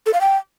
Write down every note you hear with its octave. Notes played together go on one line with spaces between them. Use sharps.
A4
F5
G5